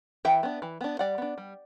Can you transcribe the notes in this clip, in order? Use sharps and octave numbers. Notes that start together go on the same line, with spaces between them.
E3 E5 G5
B3 D4
E3
B3 D4
G3 D5 F#5
B3 D4
G3